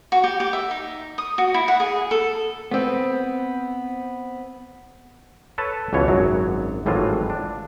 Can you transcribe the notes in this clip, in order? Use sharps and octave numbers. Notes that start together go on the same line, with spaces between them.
F#4
G4
G4
E5
D#4
D#6
F#4
E4
F#5
G#4
A4
B3 C4
A4 B4 C#5 A5
C#2 B2 E3 C#5 F#5
G#1 F#2 F#3
G#1 A2 E3 F#3 F4
D4